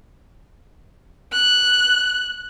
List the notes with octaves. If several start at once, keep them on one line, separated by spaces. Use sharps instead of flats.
F#6